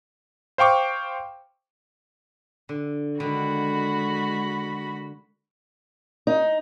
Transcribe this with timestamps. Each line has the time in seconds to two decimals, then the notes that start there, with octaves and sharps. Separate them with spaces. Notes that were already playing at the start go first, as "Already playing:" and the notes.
0.58 C5 F5 G5 C#6 D6
2.69 D3
3.20 D3 D#3 G#3 F#4 B5
6.27 D#4